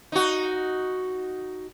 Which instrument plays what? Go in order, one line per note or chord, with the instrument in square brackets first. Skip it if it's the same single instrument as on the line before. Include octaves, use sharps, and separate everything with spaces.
[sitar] D#4 F#4